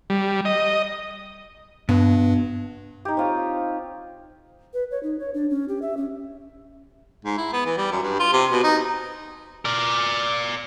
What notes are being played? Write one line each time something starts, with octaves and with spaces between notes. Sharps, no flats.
G3
D#5
G2 B2
D#4 G4
C4 F4 C#5
B4
C#5
D#4
C#5
D4
C#4
G4
E5
C#4
G#2
E4
B3
E3
G3
F#2
G2
F4
C3
B2
D#4
A#4 D5